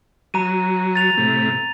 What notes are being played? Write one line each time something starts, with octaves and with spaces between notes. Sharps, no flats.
F#3 A#5 D#7
A6 F7
A2 C3